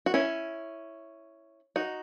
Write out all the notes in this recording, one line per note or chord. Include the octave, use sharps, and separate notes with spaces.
F#4
C#4 E4
D#4 F#4